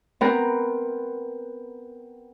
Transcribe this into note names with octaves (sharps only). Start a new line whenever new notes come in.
B3 C4 A#4